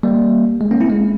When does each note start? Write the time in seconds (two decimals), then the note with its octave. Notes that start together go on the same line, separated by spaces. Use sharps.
0.03 G3 A#3
0.61 G#3
0.71 A#3 C#4
0.80 C4 E4
0.90 G#3